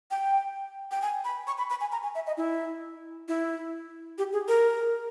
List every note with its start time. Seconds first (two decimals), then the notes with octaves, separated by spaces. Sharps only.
0.11 G5
0.91 G5
1.02 G#5
1.25 B5
1.47 C#6
1.58 B5
1.70 B5
1.81 G#5
1.92 A#5
2.03 G#5
2.15 E5
2.27 D#5
2.38 E4
3.28 E4
4.18 G4
4.33 G#4
4.48 A#4